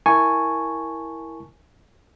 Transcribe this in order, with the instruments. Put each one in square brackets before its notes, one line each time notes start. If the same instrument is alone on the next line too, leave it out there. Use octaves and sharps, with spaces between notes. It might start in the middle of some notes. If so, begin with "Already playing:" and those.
[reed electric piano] E4 A#4 G#5 A5 C#6